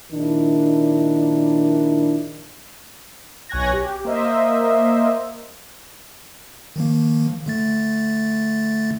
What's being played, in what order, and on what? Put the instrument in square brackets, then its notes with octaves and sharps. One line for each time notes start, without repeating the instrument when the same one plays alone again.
[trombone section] A#1 D#3 D4 E4
[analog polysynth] B1 C#5 G#5 F#6 G#6 A#6
G4
A#3 C5 D#5 E5
[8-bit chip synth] D#3 F3 A#3
D3 A3 A6